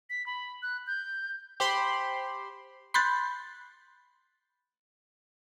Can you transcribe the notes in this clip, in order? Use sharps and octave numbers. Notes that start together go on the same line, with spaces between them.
B6
B5
F#6
G6
G4 C5 B5 C6
B5 C6 F#6 G6 A6